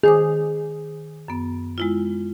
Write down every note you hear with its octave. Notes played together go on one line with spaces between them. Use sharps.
D#3 G#4 C5 D6
F#2 B3
G#3 E4 F4